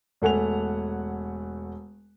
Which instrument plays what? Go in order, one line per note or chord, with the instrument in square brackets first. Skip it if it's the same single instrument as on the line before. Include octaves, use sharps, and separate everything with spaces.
[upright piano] E1 A3 F#5 G#5 F7